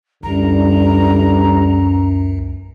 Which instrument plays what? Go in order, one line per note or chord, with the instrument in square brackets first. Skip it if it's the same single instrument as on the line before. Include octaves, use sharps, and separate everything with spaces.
[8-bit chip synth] C#2 [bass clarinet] F#2 [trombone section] D3 E3 G3 [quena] A#5